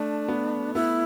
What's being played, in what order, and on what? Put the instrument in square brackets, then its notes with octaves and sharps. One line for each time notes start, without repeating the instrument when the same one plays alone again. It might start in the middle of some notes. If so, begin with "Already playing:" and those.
Already playing: [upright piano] A3 [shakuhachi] D4
[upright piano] B3
[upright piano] B3 [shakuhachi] E4